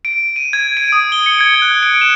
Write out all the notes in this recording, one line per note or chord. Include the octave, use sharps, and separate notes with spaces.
D7
D#7
G#6
D7
D#6
G7
C#7
G#6
F#6
D7
E7